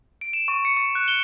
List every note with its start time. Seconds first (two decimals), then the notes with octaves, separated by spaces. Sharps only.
0.21 D7
0.33 E7
0.48 C#6
0.65 C#7
0.77 C#6
0.95 F#6
1.08 G7